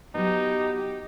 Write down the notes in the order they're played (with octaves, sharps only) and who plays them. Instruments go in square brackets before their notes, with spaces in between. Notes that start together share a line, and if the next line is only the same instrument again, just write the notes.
[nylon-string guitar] F#3 B3 [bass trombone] D#4 [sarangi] G4